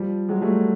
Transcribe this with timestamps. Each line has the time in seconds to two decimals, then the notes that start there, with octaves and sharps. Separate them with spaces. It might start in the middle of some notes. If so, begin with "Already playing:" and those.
Already playing: F3 G3
0.29 F#3 G#3
0.42 G3 A3